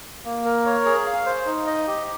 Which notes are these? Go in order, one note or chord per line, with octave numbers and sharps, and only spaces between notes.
A#3
A#4
C#5
G#4
F5
C5
D#4
D#5
G4